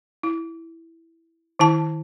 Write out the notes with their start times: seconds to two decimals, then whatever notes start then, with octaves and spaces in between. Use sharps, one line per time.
0.23 E4
1.59 D#3 E4 A5